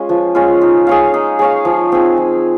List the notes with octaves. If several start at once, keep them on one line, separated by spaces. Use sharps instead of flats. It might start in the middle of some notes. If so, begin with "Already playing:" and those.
Already playing: G#3 C#4 F4
F3
G#3 C#4 F4
D#4
G#4 C#5 F5
D#4
G#4 C#5 F5
F3
C4 D#4 G#4
F3